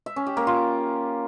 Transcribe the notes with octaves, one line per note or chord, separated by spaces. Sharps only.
E5
C#4
G4
A#3
F4